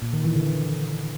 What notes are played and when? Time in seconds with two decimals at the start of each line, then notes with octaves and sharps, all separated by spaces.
0.02 A#2
0.13 D#3
0.24 E3
0.36 D3